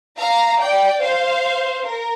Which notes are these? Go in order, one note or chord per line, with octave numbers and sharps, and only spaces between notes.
F5 A#5
D5 G5
C5 F5
A#4